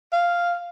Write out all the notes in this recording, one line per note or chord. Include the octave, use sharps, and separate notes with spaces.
F5